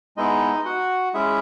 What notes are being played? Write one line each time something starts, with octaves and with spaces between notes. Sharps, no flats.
G#3 B3 D#4 E4 G#4 D#5
F#4 F#5
G#3 C#4 E4 G#4 E5